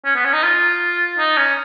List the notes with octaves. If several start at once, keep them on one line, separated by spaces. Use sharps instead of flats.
C#4
B3
C#4
D#4
F4
D#4
C#4